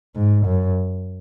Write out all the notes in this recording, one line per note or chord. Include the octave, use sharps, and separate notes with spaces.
G#2
F#2